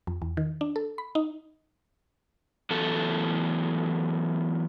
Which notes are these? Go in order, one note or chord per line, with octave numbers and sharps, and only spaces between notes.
F2
E2
D#3
D4
A4
B5
D#4
E3 F#3 A3 B3 A4